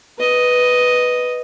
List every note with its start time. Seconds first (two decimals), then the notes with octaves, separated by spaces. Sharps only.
0.19 B4 D#5